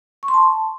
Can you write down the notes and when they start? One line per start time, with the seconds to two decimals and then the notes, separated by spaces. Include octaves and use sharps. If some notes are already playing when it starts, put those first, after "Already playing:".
0.23 C#6
0.28 C6
0.34 A5